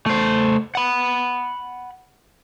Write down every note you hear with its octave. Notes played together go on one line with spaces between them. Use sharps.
A3 C5
F#5 B5